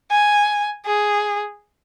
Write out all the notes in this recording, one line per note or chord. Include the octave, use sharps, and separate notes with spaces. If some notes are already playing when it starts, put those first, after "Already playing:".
G#5
G#4